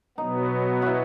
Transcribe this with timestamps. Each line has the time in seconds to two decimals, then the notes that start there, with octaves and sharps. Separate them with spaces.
0.17 B2 F#3 B3 D#4
0.82 E4 F#4